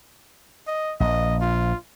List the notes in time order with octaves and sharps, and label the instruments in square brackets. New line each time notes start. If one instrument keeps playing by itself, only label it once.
[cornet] D#5
[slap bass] A#1 [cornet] D#5
[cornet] F4